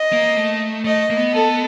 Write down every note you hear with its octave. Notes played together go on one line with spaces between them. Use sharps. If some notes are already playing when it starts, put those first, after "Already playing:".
Already playing: D#5
A#3
A3
A3 D#5
A#3
B3
A4